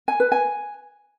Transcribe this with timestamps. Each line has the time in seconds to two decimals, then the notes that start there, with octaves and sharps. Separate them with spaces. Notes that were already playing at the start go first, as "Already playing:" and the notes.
0.08 G#5
0.20 B4
0.32 G#5